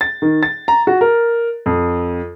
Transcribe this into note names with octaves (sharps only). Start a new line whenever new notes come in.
A6
D#3
A6
A#5
F#4
A#4
F2